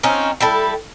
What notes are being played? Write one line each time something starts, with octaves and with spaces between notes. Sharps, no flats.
C4 C#4 D#4 F4
G3 E4 A4